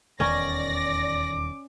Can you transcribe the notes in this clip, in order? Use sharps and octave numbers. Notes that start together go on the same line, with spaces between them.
D#1 E2 D#3 C#4 D5 A#6
D6